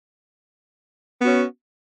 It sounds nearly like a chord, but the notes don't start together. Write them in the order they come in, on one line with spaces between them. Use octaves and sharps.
B3 F#4 C#4